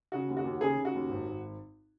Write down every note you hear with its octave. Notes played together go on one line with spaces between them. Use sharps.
C#3 F#4
D#2
F#4
D#2
C#3 G#4
C#3
F#4
D#2
G#1
G#1